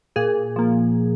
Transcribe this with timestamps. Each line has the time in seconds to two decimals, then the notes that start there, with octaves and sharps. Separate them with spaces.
0.16 A#2 G#4
0.56 F3 A#3